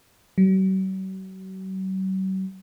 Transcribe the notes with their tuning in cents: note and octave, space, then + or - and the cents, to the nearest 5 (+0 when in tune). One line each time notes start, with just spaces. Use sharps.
F#3 +45